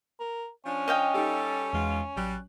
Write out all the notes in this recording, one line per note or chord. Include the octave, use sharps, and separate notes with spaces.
A#4
F3 C#4 D4
D#5 F5 G5
G3 D#4 G4 A4
E2 G#2 B2 G#3 F4
A1 F#3 G3 F#6